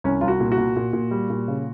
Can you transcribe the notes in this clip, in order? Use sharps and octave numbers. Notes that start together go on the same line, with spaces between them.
C2 C#4
C2 F4
F#4
A#2
F#4
A#2
A#2
A#2
G3
A#2
C#3